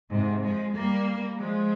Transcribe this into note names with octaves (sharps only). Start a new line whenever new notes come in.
G#2 C3
F3 G#3
G3 A#3
F3 G#3